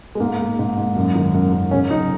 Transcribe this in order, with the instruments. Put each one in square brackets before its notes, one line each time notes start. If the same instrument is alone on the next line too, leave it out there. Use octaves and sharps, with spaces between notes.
[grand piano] G#3
G#2 A#3
G#2
G#2
G#2
F#2
D#3
F#2
F#2
C#3 C#4
F#2 D#4